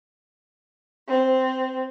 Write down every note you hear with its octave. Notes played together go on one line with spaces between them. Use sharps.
C4